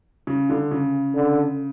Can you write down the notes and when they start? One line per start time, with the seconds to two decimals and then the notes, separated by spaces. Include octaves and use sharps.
0.27 C#3
0.50 D3
0.71 C#3
1.15 D3